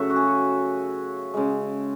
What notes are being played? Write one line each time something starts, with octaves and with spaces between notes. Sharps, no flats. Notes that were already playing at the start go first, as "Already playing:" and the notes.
Already playing: C#3 F#3 A3 E5 F#5
F#4
G#4
C#3 G#3